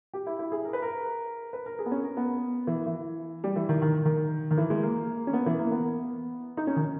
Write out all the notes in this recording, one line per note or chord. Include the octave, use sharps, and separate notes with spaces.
G4
E4
E4
G#4
A#4
B4
A#4
B4
A#4
G#4
B3
C#4
A#4
B3
E3
E3
G3
E3
D#3
D#3
D#3
D#3
E3
G#3
A#3
C#4
B3
E3
A#3
B3
D#4
C#4
D#3